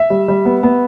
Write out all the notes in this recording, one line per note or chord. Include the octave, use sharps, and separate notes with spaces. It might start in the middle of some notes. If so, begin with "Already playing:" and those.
Already playing: E5
G3
G3
B3
B3